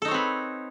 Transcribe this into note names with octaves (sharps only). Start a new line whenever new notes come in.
C4 D#4 A4 B4 C#5